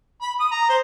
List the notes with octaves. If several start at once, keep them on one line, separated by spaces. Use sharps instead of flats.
B5
D#6
A#5
C5